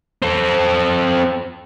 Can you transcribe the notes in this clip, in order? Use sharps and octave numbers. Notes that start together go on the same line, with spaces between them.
C4 A4